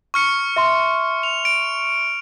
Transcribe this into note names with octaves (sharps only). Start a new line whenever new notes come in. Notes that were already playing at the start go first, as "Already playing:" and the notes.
C#6 F6 C#7
E5 C6
F7
D7